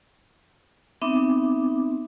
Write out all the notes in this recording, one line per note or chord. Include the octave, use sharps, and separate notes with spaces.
B3 C4 D#4 E5 D6